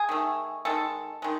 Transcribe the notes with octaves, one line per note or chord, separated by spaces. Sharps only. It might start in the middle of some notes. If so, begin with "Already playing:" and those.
Already playing: G#4
D#3 A3
D#3 G#3 A4
D#3 G#3